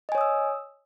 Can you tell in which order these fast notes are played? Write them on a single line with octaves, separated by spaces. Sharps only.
D#5 G#5 C#5 D#6 E6